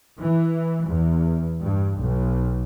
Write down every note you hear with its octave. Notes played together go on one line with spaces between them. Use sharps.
E3
E2
G2
B1